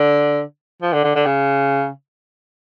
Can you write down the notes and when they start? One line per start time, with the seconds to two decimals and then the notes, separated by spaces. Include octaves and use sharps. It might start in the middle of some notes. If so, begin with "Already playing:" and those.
Already playing: D3
0.82 F3
0.93 D3
1.04 D3
1.15 D3
1.26 C#3